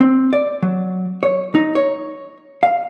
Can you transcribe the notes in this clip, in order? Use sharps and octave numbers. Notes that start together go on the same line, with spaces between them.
C4
D5
F#3
C#5
D#4
C#5
F5